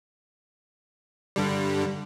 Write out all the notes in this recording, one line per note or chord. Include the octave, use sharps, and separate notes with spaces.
G2 D3 G3